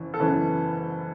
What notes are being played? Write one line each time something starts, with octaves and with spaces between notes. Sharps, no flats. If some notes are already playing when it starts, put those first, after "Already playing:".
Already playing: F#1 E3
A4
F#1 F#2 E3 B4